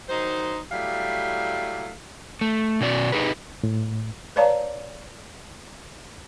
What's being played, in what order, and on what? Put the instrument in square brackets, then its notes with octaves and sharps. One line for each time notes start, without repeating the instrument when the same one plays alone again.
[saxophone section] D#3 F#3 D#4 C5
F#3 G3 A3 E4 D5 F5
[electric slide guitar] A3
B2 C#4 F#4 D5
D#4 G4 G#4 B4
[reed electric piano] A2
[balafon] B4 C#5 D5 F5 A5 A#5